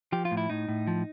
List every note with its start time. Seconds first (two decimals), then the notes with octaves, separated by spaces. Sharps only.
0.12 F3 G4
0.25 F4
0.31 A2
0.37 E4
0.50 A2 D#4
0.68 A2
0.88 F3